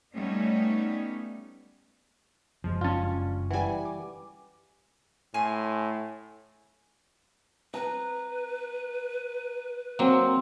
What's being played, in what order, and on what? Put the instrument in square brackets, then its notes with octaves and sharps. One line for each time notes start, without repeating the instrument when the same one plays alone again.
[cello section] G3 A3 B3 C#4 D#4
[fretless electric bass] F#1 F#2 G#3 [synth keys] F3
[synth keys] G2 C#4 [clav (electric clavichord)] F4 A5
[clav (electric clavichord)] E3 G3 [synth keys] F#5 G#5
[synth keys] D6
[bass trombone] A2 [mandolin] G#5 C6
[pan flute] B4 [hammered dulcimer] A#5
[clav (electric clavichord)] F#3 A#3 [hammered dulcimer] C4